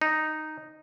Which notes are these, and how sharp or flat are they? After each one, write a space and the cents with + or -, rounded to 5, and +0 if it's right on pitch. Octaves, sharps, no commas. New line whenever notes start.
D#4 -5